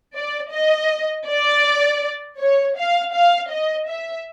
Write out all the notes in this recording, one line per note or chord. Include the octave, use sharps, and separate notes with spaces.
D5
D#5
D5
C#5
F5
F5
D#5
E5